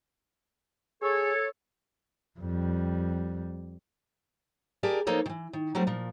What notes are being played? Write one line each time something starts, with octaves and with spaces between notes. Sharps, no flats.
G#4 A4 C#5
F2 G3
G4 G#4 A#4 D5 A5
F3 A#3 D#4 A4 C#5
D#3 E3
D#3
F#3 G3 A3 C4
A#2 F3